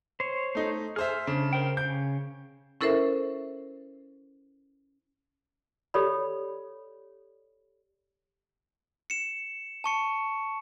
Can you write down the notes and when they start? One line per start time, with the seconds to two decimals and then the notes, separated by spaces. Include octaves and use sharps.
0.20 C5 C#5
0.55 A3 D#4
0.96 G#4 C5 E5 F6
1.27 C#3 D4
1.53 A#4 C5 G5
1.77 C#3 G6
2.81 C#4 E4 A4 A#4 C5 E5
5.94 G4 A4 C#5 D5 B5
9.10 C#7 E7
9.84 A5 C#6 C#7